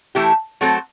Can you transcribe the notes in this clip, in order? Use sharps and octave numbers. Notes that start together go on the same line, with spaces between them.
E3 A3 E4 G4
F#3 A3 C4 F#4 A4